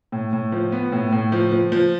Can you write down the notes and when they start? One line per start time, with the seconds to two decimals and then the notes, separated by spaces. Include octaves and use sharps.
0.12 A2
0.33 A2
0.52 F3
0.72 B3
0.92 A2
1.12 A2
1.32 F3
1.52 F3
1.72 F3